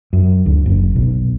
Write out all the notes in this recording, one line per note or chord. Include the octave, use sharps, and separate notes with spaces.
F#2
D2
F#1
B1